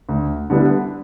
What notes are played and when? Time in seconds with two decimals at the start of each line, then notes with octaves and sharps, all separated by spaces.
0.09 D2
0.50 D3 G3 B3 E4